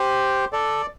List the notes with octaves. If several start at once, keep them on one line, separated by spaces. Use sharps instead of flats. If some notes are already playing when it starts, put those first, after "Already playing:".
Already playing: G4 C5
A4 D5